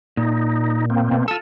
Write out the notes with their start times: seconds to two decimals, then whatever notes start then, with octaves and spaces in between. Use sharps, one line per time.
0.17 A#2 D#4
0.90 A#3 C4
1.11 B2
1.28 F4 A4 E6